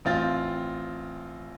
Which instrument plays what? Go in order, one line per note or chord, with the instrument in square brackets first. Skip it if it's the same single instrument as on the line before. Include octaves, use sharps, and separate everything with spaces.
[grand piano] A1 C4 F4 A6